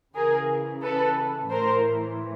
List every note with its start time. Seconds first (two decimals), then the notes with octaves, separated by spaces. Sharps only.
0.14 C#3 E3 G#4 A#4
0.82 A4 B4
1.50 A2 E3 A#4 C5